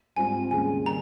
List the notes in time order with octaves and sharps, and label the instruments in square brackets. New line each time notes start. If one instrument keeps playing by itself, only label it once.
[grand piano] G#2 G3 C4 F4 [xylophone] G#5
[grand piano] D#2 C#3 G#3 [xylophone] G#5
[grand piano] D#3 G3 [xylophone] A#5